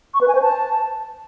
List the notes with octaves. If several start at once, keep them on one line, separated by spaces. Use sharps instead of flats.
C#6
B4
G#5
C5
A5